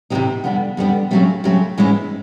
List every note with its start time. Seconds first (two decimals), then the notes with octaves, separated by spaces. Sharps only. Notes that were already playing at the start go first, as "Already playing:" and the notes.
0.10 C3 E3 G#3 C4 D#4
0.44 F2 D3 G3 B3
0.77 F2 D3 G3 B3
1.11 C#3 F#3 A3 C4
1.44 C#3 F#3 A3 C4
1.78 G#2 E3 G#3 C#4 E4